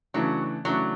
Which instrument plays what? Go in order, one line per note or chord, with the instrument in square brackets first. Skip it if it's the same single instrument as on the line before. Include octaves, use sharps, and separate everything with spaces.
[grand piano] C#3 E3 A3 D4 [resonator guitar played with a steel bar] F#3
[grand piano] C#3 E3 A3 D4 [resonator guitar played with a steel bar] F#3